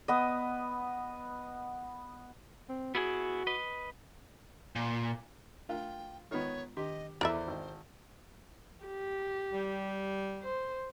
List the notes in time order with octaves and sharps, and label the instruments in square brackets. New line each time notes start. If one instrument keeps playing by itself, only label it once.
[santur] B3 D#5
[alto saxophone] C4
[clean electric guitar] B3 E4 G#4 [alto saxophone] F#4
[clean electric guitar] B4 D#5
[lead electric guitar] A#2
[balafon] A3 D4 A#4 [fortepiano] F4 [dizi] G5
[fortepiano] D#3 B3 [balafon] G#3 F4 D#5 [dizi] C#5
[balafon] D#3 D4 [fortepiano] G4 [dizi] D#5
[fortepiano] E2 [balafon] E4 A4 B5 [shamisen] A#4 D5 E5 [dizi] C5
[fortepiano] G#1
[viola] G4
[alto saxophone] G3
[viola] C5